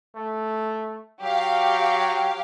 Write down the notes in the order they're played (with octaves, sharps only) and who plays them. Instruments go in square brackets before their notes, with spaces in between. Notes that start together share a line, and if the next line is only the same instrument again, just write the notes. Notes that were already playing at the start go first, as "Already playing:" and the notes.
[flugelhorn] A3
[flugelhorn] F#3 [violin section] G4 F5